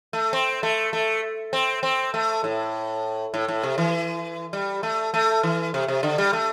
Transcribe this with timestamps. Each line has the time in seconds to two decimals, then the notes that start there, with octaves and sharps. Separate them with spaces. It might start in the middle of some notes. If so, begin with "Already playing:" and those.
0.13 A3
0.33 C4
0.63 A3
0.93 A3
1.53 C4
1.83 C4
2.14 A3
2.44 A2
3.34 A2
3.48 A2
3.63 C3
3.78 E3
4.53 G3
4.83 A3
5.14 A3
5.43 E3
5.74 C3
5.88 C3
6.03 D3
6.18 G3
6.33 A3